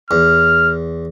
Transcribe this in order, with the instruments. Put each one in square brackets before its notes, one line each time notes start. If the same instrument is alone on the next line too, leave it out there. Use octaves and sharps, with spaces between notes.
[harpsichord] E2 [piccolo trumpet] F6